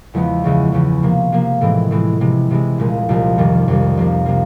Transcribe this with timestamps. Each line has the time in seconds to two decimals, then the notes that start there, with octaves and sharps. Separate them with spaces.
0.14 E2 C#3 F3 G#3 B3
0.44 C#2 C#3 E3 G#3
0.72 C#2 C#3 E3 G#3
1.03 C3 F3 A#3
1.32 C3 F3 A#3
1.61 A2 E3 G#3 C4
1.91 A2 E3 G#3 C4
2.21 C3 E3 G#3
2.51 C3 E3 G#3
2.78 C2 A#2 F3 G#3
3.09 C2 A#2 F3 G#3
3.38 F2 C3 D#3 G3
3.68 F2 C3 D#3 G3
3.97 C3 F3 A#3
4.26 C3 F3 A#3